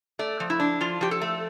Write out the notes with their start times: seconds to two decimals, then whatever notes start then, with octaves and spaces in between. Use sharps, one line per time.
0.19 A3 D5
0.40 F3
0.50 E4
0.60 D4
0.81 F3 F4
1.01 F3 G4
1.11 A4
1.21 A3